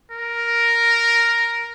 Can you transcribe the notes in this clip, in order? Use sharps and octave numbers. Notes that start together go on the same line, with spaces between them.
A#4